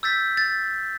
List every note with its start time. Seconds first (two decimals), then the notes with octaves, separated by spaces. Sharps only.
0.03 E6 G6 A6 B6
0.37 A6